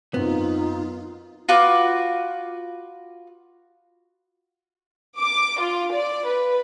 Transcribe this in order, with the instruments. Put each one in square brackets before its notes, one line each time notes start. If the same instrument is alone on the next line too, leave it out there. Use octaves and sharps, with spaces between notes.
[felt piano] F#2 F#3 C4 [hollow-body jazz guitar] B3 [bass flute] D#4 [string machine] F4
[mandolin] F4 F#4 B4 D6
[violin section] D6
F4
D5
B4